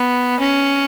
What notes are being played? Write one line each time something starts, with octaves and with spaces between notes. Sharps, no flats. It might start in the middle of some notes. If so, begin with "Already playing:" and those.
Already playing: B3
C#4